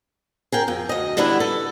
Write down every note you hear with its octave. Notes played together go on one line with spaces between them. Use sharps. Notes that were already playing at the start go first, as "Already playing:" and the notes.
G#4 A#4 G5
F2
D2 D#5
D3 G3 B3 D4 E4
A4